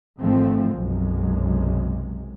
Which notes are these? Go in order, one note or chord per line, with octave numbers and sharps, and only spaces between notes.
G#1 D3 E3 F3 A3 C4
B1 F#2 C3 G#3